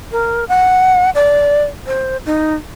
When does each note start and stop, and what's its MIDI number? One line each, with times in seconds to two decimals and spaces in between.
0.12 0.45 70
0.49 1.10 78
1.15 1.63 74
1.87 2.17 72
2.26 2.55 63